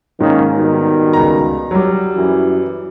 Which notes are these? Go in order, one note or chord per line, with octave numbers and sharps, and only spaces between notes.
G#2 D#3 A#3 C#4
B2 D#3 G3
C#2 A#5
F#3 G3
F#2 E3